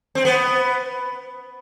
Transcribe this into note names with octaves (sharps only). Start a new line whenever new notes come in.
C4
B3